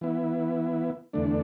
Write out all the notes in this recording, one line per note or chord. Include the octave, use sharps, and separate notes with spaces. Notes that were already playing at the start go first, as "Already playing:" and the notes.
E3 B3 E4
E2 D3 A3 D4